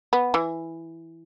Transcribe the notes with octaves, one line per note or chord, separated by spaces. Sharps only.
B3
E3